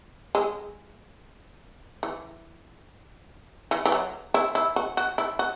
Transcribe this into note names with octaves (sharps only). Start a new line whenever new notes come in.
G#3
E3
E3
E3
F#3
E4
E4
F#4
F#4
E4
F#4